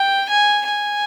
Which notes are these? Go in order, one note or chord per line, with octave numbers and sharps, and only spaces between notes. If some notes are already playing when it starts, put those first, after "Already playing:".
Already playing: G5
G#5
G#5